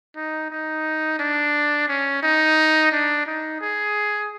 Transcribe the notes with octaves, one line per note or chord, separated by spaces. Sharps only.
D#4
D#4
D4
C#4
D#4
D4
D#4
G#4